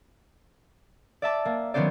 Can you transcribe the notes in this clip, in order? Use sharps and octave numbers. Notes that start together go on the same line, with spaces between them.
D5 E5 A5 D6
A#3
D#3 F#3 B3 C#4 C5 D5